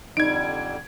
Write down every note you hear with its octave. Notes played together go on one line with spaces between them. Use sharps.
F2 D3 G3 D#4 G#6 D7